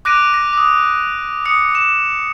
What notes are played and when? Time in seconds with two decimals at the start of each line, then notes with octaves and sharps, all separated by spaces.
0.05 D6 F#6 A#6 D7 D#7
0.34 A#6
0.53 D6 D#6
1.45 D#6 C#7
1.75 E7